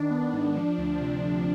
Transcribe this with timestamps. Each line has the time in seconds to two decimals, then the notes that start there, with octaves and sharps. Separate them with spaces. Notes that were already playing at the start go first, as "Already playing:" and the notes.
Already playing: D#3 D4
0.11 B3
0.33 G#2
0.56 F3
0.78 D2
1.01 C3